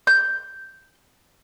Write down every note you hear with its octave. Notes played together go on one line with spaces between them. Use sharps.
G6